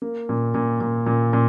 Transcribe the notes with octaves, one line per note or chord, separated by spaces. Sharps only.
A#3
A#2
A#2
A#2
A#2
A#2